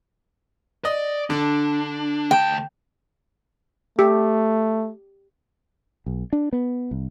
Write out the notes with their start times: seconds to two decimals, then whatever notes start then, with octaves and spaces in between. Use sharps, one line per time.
0.85 D5 D#5
1.30 D3 D4
2.31 D2 G5 A5
3.99 A3 G4
6.06 B1
6.33 D4
6.53 B3
6.91 C2